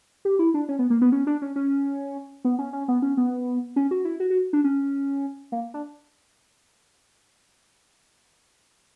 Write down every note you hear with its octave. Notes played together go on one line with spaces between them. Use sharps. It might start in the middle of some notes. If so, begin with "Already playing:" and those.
G4
E4
D4
C#4
B3
A#3
B3
C#4
D4
C#4
C#4
B3
C#4
C#4
B3
C#4
B3
C#4
F#4
E4
F#4
F#4
D4
C#4
A#3
D4